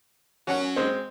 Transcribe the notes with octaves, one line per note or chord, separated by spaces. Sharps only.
F#3 C#4 F#4 F#5
G#3 C4